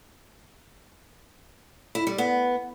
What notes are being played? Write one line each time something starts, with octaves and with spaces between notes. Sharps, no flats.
E4
G3
B3